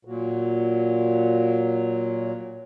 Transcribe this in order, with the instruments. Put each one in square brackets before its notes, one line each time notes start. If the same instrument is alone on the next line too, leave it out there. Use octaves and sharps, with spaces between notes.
[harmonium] A#2 F#3